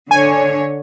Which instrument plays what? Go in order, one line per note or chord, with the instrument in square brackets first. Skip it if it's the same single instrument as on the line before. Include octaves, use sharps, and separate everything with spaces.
[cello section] D3 C#5 [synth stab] G#5